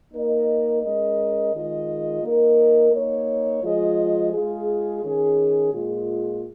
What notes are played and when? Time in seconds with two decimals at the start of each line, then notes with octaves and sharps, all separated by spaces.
0.13 A#3 D#4 A#4 D#5
0.83 G#3 C#4 A#4 D#5
1.53 D#3 G#3 F4 G#4 D#5
2.23 A#3 D#4 A#4 D#5
2.93 A#3 D#4 C#5
3.63 F3 G#3 F4 G#4 D#5
4.33 G#3 F4 G#4
5.03 D#3 C#4 G#4
5.73 A#2 G#3 F4 G#4